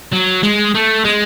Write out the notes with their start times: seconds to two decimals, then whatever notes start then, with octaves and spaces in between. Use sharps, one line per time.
0.13 F#3
0.43 G#3
0.74 A3
1.04 G#3